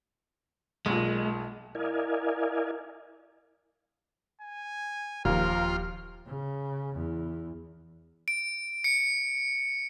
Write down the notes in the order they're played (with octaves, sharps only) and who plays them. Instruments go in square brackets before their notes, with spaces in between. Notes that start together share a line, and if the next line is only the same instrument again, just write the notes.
[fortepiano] B1 A#2 [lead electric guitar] G#3
[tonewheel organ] E4 A#4 D5 D#5 F5 G#5
[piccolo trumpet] G#5
[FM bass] D#1 [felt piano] D#2 F3 [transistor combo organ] F4 [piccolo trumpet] A#4
[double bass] C#3
E2
[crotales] D7
C#7